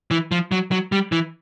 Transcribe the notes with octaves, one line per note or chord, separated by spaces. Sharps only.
E3
F3
F#3
F#3
G3
E3